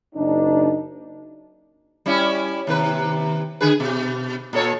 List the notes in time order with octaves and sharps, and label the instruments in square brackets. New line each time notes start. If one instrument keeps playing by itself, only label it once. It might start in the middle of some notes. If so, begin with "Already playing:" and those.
[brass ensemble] F#1 D4 D#4
[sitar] G3 C#4 E4
D#2 C3 B4
D3 G#4 B4
B2
A#2 A4 C#5